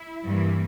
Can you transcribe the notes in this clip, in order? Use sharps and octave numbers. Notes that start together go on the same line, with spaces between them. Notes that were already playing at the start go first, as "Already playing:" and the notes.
Already playing: E4
G2 E3 G3 A#3